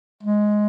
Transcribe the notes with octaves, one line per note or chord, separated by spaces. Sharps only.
G#3